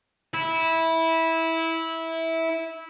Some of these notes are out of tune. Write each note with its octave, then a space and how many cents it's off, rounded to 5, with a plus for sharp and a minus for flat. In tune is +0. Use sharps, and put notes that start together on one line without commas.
E4 -15